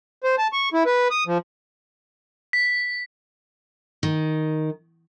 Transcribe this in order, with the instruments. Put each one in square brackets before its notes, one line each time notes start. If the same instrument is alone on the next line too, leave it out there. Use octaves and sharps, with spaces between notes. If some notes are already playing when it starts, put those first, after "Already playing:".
[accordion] C5
A5
C#6
E4
B4
D#6
F3
[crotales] B6
[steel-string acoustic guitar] D#3